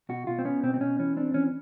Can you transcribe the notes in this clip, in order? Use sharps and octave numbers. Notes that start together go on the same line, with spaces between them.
B2 F#4
B2 F4
C4
B3 C#4
B2 C4
C4
B2 C#4
E3 C#4
C4 D4
E3 C#4